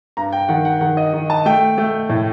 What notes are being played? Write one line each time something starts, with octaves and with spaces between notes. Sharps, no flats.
G2 A#5
G5
D#3 F#5
F#5
D#3 F#5
D#5
D#3
A5
A3 G5
A3
A2